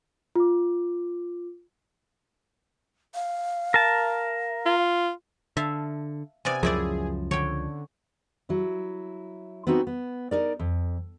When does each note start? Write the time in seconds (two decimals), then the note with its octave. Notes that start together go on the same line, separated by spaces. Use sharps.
0.35 F4 D6
3.14 F5
3.74 A#4 A5
4.66 F4
5.57 D3 E5 F5 A5
6.45 C3 B3 D5 G#5
6.63 C#2 F#2 F3 E4 G#4 D5
7.31 D3 C#5 G5
8.49 F#3 E4
9.67 B3 C4 D#4 F#4 B4
9.87 B3
10.31 D#4 A#4 D5
10.59 F2